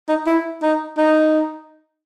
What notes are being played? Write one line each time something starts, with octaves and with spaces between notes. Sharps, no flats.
D#4
E4
D#4
D#4